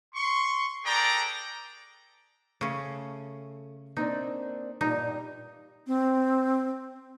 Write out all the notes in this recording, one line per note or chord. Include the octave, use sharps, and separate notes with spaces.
C6 C#6
G#4 A4 B4 D5 G5 A#5
C#3 A3 C#4
A#3 C4 D4 D#4
G2 A#2 G3 D#4
C4